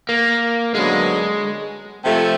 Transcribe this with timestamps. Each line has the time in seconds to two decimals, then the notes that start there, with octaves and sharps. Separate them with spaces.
0.09 A#3
0.74 F#2 D3 F#3 G#3 B3
2.03 C3 F3 A3